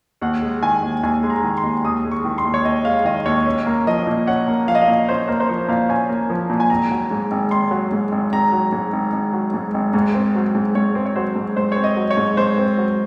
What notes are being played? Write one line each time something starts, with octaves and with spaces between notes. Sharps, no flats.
D#2 F#5
G#3
D#3 G#5
D#2
D#2 G#5
G#3 C6
A#5
D#3
C6
D#2
D#2 D#6
G#3
C#6
D#3
C6
D#2
C#5
D#2 D#5
G#3 F5
D#3 D#5
D#2 C#5
C#4
A#3
F3 D#5
A#2
C#4 F#5
A#3
F3 F5
D#5
F5
A#2
C#4 C5
A#3 C5
C5
F3 C#5
A#2 F5
C#4 G#5
A#3
F3
A#2
G#5
G#1 A#5
F#3
G#2
G#1
G#1 C6
F#3
G#2
G#1
G#1 A#5
F#3
G#2
G#1
G#1
F#3
G#2
G#1
G#2
C4
F#3
G#2
G#2 C#5
C4
C#5
F#3 C5
G#2
G#2 C5
C4 C#5
D#5
F#3
C#5
G#2
G#2 C5
C4
F#3